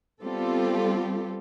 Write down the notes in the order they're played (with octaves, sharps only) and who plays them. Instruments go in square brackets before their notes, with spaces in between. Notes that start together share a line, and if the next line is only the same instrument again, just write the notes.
[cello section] G3 B3 C4 F4 G4 A4